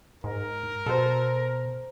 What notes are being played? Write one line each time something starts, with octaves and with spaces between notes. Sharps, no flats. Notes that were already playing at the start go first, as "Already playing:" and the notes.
G#2 A#4
B2 A4 C5